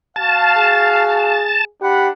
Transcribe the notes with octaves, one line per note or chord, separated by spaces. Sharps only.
F#4 F5 A5
G#4
D4 G4 F#5 B5